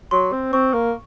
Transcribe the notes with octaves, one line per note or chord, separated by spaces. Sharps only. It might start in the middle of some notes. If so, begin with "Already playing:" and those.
F#3 C6
C4
C4 C#6
A#3